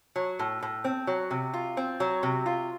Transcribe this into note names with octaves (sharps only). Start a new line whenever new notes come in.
F#3
A2
A2
C4
F#3
C3
F4
C4
F#3
C3
F4